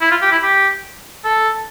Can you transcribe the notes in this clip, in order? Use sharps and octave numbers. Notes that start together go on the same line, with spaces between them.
E4
F4
G4
E4
G4
A4